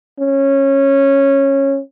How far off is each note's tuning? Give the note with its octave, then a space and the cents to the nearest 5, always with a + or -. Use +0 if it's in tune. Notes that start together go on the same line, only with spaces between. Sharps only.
C#4 -15